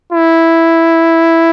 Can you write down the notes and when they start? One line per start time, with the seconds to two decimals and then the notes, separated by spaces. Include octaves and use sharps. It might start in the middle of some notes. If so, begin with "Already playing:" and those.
0.12 E4